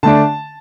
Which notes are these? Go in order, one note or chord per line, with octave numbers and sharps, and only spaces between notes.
D3 A3 D4 A5